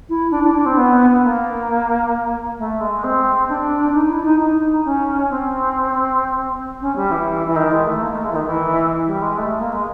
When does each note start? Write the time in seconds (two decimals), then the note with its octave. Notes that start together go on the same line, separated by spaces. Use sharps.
0.09 E4
0.31 D4
0.44 D4
0.55 D4
0.66 C4
0.77 B3
1.10 B3
1.23 A#3
2.58 A3
2.81 G#3
3.04 C4
3.49 D4
3.94 D#4
4.09 E4
4.24 D#4
4.40 D#4
4.85 C#4
5.30 C4
6.81 C#4
6.96 G3
7.11 E3
7.47 E3
7.56 D#3
7.72 G#3
7.86 A3
8.02 A#3
8.13 A3
8.25 G#3
8.32 E3
8.36 D#3
8.47 E3
9.07 G3
9.22 G#3
9.37 A3
9.60 A#3
9.72 G#3